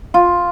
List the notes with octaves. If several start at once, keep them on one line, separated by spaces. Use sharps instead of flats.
F4